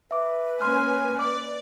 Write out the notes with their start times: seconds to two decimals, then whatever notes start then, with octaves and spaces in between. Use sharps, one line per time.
0.11 B4 E5 D6
0.61 A#3 C#4 G#5 C6 F6
1.19 D5 D6